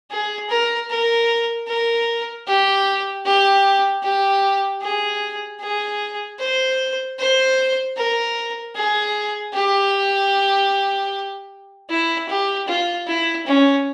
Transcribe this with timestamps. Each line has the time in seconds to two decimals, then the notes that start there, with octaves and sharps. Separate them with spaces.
0.11 G#4
0.49 A#4
0.90 A#4
1.68 A#4
2.47 G4
3.25 G4
4.03 G4
4.82 G#4
5.61 G#4
6.39 C5
7.19 C5
7.97 A#4
8.75 G#4
9.54 G4
11.90 E4
12.29 G4
12.68 F4
13.07 E4
13.47 C#4